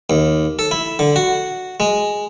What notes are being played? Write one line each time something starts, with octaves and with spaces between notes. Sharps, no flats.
D#2
A4
E4
D3
F#4
G#3